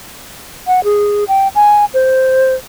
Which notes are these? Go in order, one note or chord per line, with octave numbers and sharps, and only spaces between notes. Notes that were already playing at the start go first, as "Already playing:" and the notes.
F#5
G#4
G5
G#5
C5